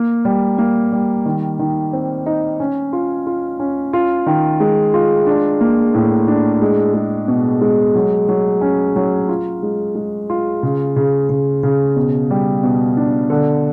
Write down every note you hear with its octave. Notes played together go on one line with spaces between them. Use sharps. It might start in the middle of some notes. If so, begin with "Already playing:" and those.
Already playing: A#3
G3
A#3
G3
D#3
D#3
C4
D#4
C#4
F4
F4
C#4
F4
D#3
G#3
F4
D4
A#3
A2
D4
G#3
G#3
B2
G#3
F#3
F#3
C#4
F#3
F4
G#3
G#3
F4
C#3
C#3
C#3
C#3
B2
G3
B2
D4
D3